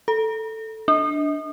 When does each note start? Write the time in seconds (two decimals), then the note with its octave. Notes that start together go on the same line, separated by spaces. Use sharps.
0.08 A4
0.88 D4